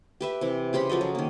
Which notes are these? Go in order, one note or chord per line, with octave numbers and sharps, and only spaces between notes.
G4 B4 E5
C3 E3
C#3 G4 C5 B5
F3 F#3 A4 D#5
F#3
D#3 A#3